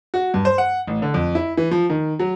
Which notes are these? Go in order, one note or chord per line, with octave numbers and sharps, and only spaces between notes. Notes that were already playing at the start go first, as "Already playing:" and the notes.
F#4
G2
C5
F#5
A1
D3
F2
E4
E3
F3
D#3
F#3